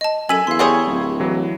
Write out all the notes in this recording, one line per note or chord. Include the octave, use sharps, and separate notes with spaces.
D#5 A5
F#2 A4 G#5 E6 B6 D#7 F#7
E2 F5 C6
G3 G#4 C#5 F5 C6 D#6
D1
E3 F#3